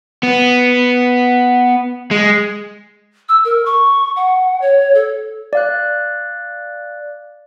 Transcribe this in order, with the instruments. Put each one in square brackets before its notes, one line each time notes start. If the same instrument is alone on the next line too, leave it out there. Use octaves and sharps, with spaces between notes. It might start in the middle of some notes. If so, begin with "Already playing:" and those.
[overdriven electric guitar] B3
G#3
[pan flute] E6
A#4
C#6
F#5
C#5
A4
[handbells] D5 F5 F#6